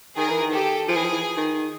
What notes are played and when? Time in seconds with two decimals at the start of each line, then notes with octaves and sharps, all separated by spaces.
0.17 D#3 G#4 A#4
0.30 E3
0.41 D#3
0.53 G4 A4
0.89 F3 G#4
0.96 E3
1.05 F3
1.13 E3
1.37 D#3